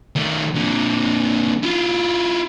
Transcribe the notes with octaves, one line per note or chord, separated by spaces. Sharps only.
D#3 A3
A#2 D3
E4 F4